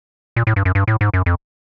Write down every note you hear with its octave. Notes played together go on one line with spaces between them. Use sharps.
A#2
A2
G2
F#2
G2
A2
G#2
F#2
F2